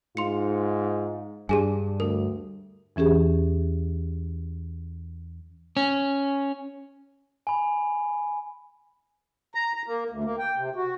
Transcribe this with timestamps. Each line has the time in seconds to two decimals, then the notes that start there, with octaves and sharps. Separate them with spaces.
0.17 G#2 F4 C6 C#7
1.49 G2 D4 G4 G#4 G#5
2.00 D2 A#4
2.96 E2 E3 C#4 G4 G#4
5.77 C#4
7.47 G#5 B5
9.55 A#5
9.75 A#5
9.86 A#3
10.10 D2
10.24 A#3
10.38 G5
10.56 C3
10.76 F#4